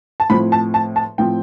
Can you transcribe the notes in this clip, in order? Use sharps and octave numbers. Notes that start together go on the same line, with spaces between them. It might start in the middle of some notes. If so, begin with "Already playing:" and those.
A5
A2 F3 C4 B5
A5
A5
A5
A2 F3 C4 G5